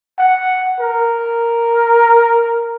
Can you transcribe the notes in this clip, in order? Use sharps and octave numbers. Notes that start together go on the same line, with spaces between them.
F#5
A#4